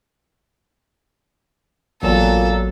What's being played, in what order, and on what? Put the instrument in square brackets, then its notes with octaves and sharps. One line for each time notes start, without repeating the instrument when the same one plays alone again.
[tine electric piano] A1 [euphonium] A#2 [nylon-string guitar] F#3 B3 [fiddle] A4